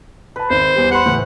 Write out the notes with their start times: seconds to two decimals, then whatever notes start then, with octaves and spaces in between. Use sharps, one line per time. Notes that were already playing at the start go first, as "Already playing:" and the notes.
0.36 B4 A5 B5
0.50 G#1 C5
0.76 E2 G3
0.91 B4 F#5 B5 C6
1.06 A2 E3 C5